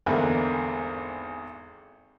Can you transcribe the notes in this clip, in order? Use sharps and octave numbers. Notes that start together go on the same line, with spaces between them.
G#1 E2 D3 A#3 E5